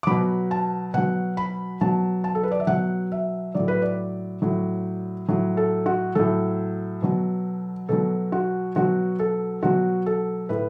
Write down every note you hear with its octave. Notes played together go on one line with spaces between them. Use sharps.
D6
B2 F#3 B5
A5
B2 F#3 F#5
B5
B2 F#3 A5
A5
A4
B4
D5
E5
B2 F#3 F#5
E5
A2 F#3 D5
B4
D5
A2 F#3
A2 F#3
A4
F#4
A2 F#3 A4
B2 F#3
B2 F#3 A4
F#4
B2 F#3 F#4
A4
B2 F#3 F#4
A4
A2 B4